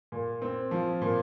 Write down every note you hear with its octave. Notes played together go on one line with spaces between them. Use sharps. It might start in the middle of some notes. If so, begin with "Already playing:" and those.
A#2
C4
F3
A#2